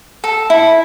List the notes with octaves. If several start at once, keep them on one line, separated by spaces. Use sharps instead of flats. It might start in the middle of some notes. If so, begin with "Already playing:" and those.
A4
E4